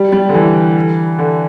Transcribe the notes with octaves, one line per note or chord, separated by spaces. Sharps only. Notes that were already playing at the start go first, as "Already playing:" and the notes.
Already playing: G3
G3
D3
E3
D3